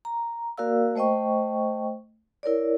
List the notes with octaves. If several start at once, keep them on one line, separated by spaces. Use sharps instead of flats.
A#5
A#3 F#4 A#4 D5 F5 E6
A3 C5 D#5 G5 C#6
E4 A#4 C#5 D5